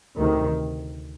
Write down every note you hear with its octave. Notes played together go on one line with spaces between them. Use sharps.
D2 C3 D#3